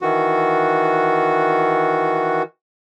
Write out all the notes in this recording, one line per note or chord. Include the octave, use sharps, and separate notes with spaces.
D#3 E3 F#4